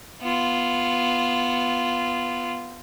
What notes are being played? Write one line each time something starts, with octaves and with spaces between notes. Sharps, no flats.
B3 F4